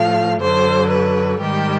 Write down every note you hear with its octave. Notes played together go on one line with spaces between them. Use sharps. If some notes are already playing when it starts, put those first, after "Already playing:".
Already playing: A2 F3 A3 F5
F#2 D3 F#3 C5
B4
G#2 D#3 G3 G4